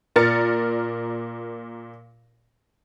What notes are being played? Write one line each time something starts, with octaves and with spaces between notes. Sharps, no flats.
A#2 A#4 D5 F6 A6 C#7